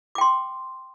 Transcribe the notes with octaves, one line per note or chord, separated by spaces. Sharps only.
G5 C6 D6